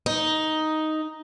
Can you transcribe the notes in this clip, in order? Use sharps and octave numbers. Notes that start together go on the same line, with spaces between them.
D#4